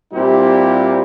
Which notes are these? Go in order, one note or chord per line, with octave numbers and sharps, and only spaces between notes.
A#2 G3 C4 E4 G4